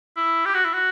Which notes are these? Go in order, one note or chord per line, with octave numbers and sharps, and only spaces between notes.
E4
G4
F#4
E4
F#4